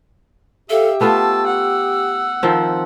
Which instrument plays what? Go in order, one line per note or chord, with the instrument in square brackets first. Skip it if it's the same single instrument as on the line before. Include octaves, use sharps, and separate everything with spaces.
[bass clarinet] G4 [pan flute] A4 [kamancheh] E5 F5
[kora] A3 B3 F4 [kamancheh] A5 [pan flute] E6
[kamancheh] F#5
[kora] D#3 F3 C4